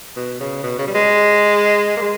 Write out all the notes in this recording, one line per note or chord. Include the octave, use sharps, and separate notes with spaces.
B2
C#3
B2
C#3
G3
G#3
A#3
G#3